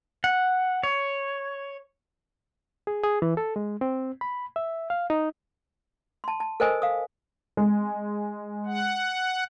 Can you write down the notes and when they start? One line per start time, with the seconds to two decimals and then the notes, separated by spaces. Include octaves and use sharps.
0.24 F#5
0.83 C#5
2.87 G#4
3.04 G#4
3.22 E3
3.37 A4
3.56 G#3
3.81 C4
4.21 B5
4.56 E5
4.90 F5
5.10 D#4
6.24 A5 C6
6.40 A5
6.60 A4 A#4 C5 D#5 G#5 D#6
6.82 F5 D#6
7.57 G#3
8.66 F#5